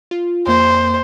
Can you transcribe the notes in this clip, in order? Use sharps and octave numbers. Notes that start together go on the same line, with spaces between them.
F4
F2 A#3 C5 G6